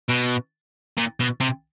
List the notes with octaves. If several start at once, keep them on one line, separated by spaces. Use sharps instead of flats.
B2
A#2
B2
C3